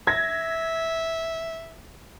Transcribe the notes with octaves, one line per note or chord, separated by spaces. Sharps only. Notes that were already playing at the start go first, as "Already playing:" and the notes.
E5 G#6 A#6